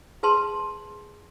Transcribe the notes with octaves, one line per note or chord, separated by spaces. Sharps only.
G#4 B4 A5 C6